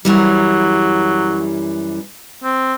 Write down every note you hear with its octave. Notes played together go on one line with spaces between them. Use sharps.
F#2 E3 F#3 G3
C4